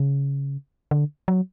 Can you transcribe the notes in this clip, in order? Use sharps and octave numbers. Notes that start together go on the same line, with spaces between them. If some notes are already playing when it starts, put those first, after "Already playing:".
Already playing: C#3
D3
F#3